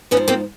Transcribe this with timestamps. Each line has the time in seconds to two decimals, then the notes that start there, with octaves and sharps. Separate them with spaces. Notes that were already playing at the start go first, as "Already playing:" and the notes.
0.11 G#2 B3 C#4
0.17 F3
0.28 A#3 C4